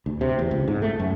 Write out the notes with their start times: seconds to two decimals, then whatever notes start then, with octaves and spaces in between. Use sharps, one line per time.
0.06 D2
0.21 C3
0.39 E2
0.51 C#2
0.68 G#2
0.82 A3
1.00 F#2